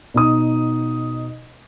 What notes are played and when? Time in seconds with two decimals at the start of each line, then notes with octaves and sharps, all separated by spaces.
0.14 B2 D#4 D#6